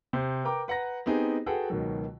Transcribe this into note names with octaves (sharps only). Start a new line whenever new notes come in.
C3 C5 G6
A#4 B4 G5 A#5 D6
B4 F#5 A#5 A#6
B3 C4 D#4 G4 G#4
F#4 G#4 A4 B4 F#5 G5
C#2 B2 D#3 F#3